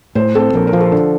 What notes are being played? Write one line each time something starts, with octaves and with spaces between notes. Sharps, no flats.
A2 C5
C4 A4
A#1 A#4
A#4
F3
A4
D3